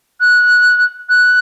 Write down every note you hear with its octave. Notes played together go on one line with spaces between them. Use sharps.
F#6
F#6